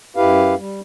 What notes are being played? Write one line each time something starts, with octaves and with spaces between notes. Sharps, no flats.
F#2 E4 G4 B4 F5
G3